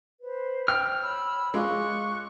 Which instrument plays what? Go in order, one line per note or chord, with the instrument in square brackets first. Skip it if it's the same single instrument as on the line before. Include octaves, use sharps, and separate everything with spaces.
[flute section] B4 C5
[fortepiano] G5 [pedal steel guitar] F6
[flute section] C#5 B5 E6
[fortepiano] G#3 F4 [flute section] C#6 D6 F#6